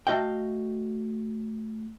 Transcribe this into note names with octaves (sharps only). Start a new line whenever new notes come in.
A3 F#4 D#5 F5 G5